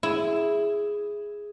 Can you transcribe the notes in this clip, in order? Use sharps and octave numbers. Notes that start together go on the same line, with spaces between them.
E4 G#4